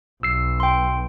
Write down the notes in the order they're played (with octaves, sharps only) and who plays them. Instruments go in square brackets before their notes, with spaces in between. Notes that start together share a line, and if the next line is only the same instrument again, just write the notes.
[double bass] B1 [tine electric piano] E6 C7
[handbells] G5 C6